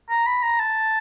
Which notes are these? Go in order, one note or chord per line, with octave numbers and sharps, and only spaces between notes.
A#5
B5
A#5
A5